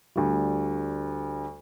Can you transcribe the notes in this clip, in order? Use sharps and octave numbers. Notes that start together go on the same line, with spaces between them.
D2 G3